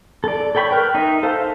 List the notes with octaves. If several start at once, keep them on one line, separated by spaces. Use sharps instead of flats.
A4 D5
A4 C#5 G5 B5 C#6
A#4 B4 G5
D#4 E5
A4 C5 F5 A5